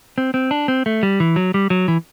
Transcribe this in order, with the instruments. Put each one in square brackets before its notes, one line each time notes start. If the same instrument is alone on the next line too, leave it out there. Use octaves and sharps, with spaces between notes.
[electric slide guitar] C4
C4
D4
C4
A3
G3
E3
F#3
G3
F#3
E3